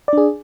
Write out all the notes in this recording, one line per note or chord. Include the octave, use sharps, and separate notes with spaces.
D4 G#4 D5